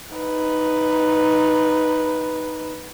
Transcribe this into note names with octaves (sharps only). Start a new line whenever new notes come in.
D#4 B4